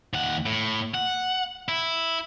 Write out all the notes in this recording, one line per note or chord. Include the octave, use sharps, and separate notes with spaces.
D#2 F#5
A2
F#5
E4